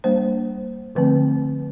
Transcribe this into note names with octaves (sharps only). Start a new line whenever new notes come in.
G3 A#3 D4 C5
D3 F3 A3 C4 B4